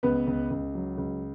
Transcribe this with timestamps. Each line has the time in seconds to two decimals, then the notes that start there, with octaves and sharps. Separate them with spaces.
0.03 C#2 B3 B4
0.27 C#2
0.50 C#2
0.75 F#3
0.98 C#2